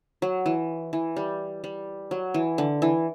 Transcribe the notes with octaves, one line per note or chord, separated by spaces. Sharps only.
F#3
E3
E3
G3
G3
F#3
E3
D3
E3